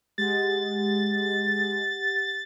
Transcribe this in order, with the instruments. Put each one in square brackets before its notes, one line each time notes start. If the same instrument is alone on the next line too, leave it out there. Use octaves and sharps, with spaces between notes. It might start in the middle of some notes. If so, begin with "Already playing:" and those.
[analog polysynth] G#3 [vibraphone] G4 F#5 [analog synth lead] A6